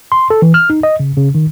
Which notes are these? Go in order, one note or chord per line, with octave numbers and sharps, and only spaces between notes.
C6
A4
E3
F6
D#4
D#5
C#3
C#3
D#3